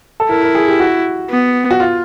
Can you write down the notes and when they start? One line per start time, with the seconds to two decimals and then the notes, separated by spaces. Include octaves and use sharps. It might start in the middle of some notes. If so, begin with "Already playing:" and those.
0.20 A4
0.30 E4 A#4
0.43 A#4
0.55 G#4
0.68 G4
0.80 F#4
1.30 B3
1.71 F#4
1.80 F4